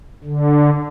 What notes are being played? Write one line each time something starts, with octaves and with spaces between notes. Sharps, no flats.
D3